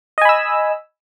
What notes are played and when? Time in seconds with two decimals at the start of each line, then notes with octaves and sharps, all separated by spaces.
0.18 D#5
0.22 G#5
0.25 B5
0.29 E6